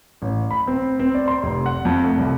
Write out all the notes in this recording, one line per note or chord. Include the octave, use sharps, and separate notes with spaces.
A1
B5
C4
C4
D5
C6
F1
F#5
F2
A3
C2